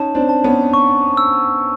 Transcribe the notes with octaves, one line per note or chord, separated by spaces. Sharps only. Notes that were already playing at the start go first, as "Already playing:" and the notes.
Already playing: C#4 D#4 A5
C4 D4
A5
B3 C#4
C#6
E6